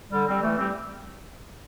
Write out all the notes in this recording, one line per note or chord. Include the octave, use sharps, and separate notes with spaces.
D3 G3
G3 C4
E3 A3
G3 C4